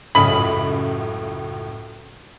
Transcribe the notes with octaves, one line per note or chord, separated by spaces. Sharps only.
C#2 F#2 A2 C#4 D#5 B5